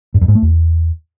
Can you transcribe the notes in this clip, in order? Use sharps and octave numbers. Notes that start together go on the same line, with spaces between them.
G2
F2
G#2
A3
E2